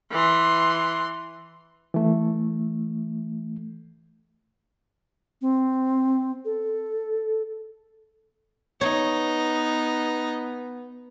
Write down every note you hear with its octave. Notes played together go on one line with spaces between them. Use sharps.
E3 C6
E3 A3
C4
A4
B3 D#4 C#5